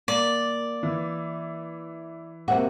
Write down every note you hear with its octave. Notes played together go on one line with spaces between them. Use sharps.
A#3 D5
E3
C3 A#3 F#4 E5 F#5